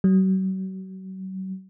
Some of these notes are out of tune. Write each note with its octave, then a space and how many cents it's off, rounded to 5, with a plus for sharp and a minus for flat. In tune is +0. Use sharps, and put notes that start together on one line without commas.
F#3 +40